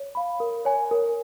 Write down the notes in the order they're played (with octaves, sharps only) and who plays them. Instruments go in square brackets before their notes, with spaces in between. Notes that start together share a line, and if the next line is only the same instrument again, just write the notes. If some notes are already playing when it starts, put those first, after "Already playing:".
Already playing: [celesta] C#5
F5 B5
A#4
C#5 G#5
A#4